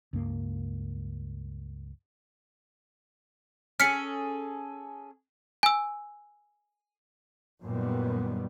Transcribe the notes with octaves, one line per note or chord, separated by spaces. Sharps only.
C#2 G2 A#3
C#4 G#4 A4 F6 B6 C#7
G#5 E6
F#2 A#2 D#3 G3 B3